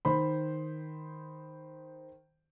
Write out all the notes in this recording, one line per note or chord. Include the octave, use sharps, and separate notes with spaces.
D#3 C5 B5